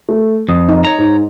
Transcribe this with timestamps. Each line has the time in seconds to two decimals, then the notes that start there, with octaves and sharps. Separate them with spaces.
0.09 A3
0.49 F2 D#6
0.69 D#4
0.85 C#5 A#5
0.98 G#2